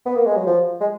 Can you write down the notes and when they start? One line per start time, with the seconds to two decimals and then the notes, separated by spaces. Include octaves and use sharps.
0.06 B3
0.16 A#3
0.26 G#3
0.36 F#3
0.46 F3
0.81 G#3